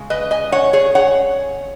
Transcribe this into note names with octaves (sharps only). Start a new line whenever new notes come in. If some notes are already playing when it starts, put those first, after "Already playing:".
Already playing: C#3 G#3
B4 D#5
D#5 G#5
C#5 F#5
G#4 C#5
C#5 F#5